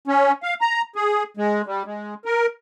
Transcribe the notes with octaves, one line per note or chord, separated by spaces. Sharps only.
C#4
F5
A#5
G#4
G#3
G3
G#3
A#4